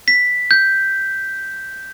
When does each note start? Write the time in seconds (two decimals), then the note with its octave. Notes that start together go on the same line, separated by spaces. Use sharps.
0.08 B6
0.51 G6